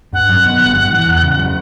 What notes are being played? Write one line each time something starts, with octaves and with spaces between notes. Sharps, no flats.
G2 F#5
F#3
B3
G1
G2
E3
E2
C#3
F#3